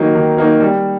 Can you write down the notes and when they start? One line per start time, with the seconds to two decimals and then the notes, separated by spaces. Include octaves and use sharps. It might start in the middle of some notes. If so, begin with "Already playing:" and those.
Already playing: D#3 F#3 A#3 D#4
0.15 D#3
0.38 F#3 A#3 D#4
0.60 G3